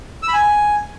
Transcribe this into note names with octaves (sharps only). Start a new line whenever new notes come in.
E6
B5
G#5